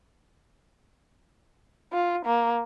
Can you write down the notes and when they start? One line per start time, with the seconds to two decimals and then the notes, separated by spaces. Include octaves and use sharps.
1.93 F4
2.26 A#3